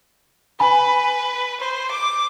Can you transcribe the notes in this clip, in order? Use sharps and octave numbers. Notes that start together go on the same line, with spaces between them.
B4 G#5 B5
C5
D6